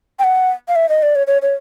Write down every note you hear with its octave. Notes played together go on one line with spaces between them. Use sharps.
G5
F#5
F5
E5
D#5
D5
C#5
C#5
C#5